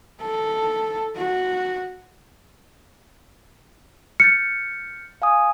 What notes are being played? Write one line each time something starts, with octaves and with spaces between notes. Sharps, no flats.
A4
F#4
F6 G6 A6 C#7
F5 G#5 D#6